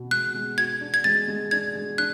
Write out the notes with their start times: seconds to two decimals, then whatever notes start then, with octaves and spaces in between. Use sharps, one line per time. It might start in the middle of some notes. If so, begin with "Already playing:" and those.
Already playing: B2 F#4
0.11 G#3 F#6
0.34 G#3
0.58 F#4 G#6
0.81 D4
0.94 G#6
1.04 G#3 A6
1.28 G#3
1.51 D4 G#6
1.75 G#3
1.98 D4 F#6